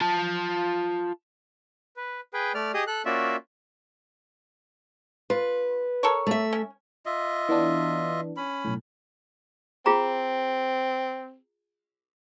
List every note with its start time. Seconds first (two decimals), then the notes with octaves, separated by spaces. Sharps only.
0.01 F4 A5
1.96 B4
2.33 G#4 B4 G5
2.54 A3 D5 F6
2.74 G4 G#4 D#5 D#6
2.87 A4 F#6
3.05 A#3 C#4 F4 F#4 D5 E5
5.30 F4 B4
6.03 A4 A#4 C#5
6.27 A3 E5
6.53 C#4
7.06 F4 D#5 E5
7.49 E3 B3 D4
8.37 C#4 B5
8.65 B1 A2
9.86 C4 F4 G#4 A#5